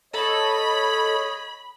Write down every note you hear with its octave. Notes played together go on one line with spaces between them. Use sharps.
A4 C#5 D#5 B5